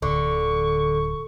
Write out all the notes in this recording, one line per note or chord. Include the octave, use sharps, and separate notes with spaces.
D1 D3 C#6